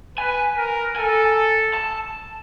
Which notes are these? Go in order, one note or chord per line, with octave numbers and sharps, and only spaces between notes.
B4 G#5
A#4
A4 G#5
A5